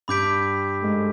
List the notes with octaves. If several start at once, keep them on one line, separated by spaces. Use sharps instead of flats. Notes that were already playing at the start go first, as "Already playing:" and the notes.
G2 G3 B5 D6 G6 B6 D7
A3
G#2 G#3